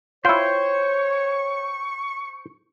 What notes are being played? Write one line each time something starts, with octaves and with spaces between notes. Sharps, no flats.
E4 F4 C5 C#5 G5 C#6